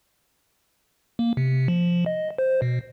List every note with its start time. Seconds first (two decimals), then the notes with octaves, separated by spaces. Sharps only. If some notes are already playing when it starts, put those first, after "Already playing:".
1.19 A#3
1.37 C3
1.68 F3
2.06 D#5
2.38 C5
2.62 B2